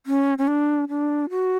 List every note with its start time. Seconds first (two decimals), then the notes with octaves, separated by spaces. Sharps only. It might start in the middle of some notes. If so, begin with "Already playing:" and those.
0.06 C#4
0.38 C#4
0.48 D4
0.89 D4
1.30 F#4